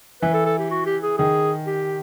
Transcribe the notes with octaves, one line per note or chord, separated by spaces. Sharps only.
E3 B4
A4
A4
G4
F#4
G4
G#4
D#3 G#4
G4